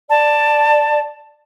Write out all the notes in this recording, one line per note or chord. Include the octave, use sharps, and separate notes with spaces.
D5 A5